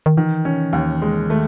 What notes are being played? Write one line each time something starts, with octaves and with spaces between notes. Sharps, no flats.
D#3
D#3 E3
C#4
D#2
G#3
D#3 A3